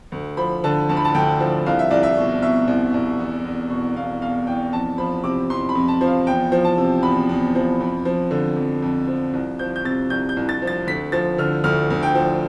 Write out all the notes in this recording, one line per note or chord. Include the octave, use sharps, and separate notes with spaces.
D2
F3 B5
D3 A5
D2 A5
B5
A5
D2 G5
F3
C2 F5
E5
C2 D5
E5
B2
B2 E5
C2
C2
E2
E2
B2
B2 F5
E2 F5
E2 G5
F2 A5
F3 B5
C3 D6
F2 C6
B5
F2
A5
F3
F5
E2 G5
F3
A5
C3
E2 B5
E2
F3
F2
F3
D3
F2
F2
F3
C2
F3 G6
G6
C3 A6
C2 G6
G6
C2
A6
F3
A6
D2 B6
F3 A6
D3 F6
D2 F6
D2
G5
F3